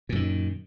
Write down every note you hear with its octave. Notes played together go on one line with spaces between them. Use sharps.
F#2 A#2 D#3